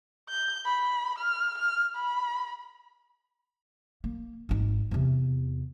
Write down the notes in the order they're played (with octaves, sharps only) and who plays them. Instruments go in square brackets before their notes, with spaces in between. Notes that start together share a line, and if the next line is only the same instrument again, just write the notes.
[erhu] G6
B5
F6
F6
B5
[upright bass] A#3
G#1 D#4
E2 C3